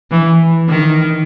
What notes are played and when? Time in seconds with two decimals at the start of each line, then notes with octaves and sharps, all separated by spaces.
0.11 E3
0.69 D#3